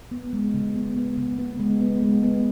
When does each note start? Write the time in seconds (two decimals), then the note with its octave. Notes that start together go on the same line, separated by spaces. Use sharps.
0.11 B3
0.33 G#3
0.54 C#3
0.76 B3
0.96 B3
1.17 C#3
1.39 B3
1.60 G#3
1.81 B3
2.02 G#3
2.23 B3